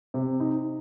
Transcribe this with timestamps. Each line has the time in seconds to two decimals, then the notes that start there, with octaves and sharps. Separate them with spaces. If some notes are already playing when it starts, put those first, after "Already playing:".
0.14 C3
0.40 D#4